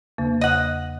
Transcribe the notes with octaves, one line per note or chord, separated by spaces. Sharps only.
E2 C#3 A#3
D#5 F#5